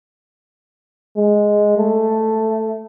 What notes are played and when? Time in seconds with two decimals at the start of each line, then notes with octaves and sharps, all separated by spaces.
1.16 G#3
1.78 A3